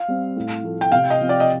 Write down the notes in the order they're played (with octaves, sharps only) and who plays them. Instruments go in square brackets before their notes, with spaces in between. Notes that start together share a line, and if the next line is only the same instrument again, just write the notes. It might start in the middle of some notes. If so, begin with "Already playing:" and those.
Already playing: [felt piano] F5
[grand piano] G3 C4
A2
F3 A3
[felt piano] G5
[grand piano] C3 [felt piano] F5
[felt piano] D#5
[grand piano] F3 C4
[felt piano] D5
D#5